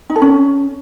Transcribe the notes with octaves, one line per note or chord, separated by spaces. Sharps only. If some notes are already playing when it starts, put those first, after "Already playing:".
D#4
A4
C#4